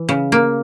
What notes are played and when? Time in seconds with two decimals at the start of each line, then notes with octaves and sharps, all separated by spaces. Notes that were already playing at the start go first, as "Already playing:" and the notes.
Already playing: E3
0.09 C#3
0.32 A#3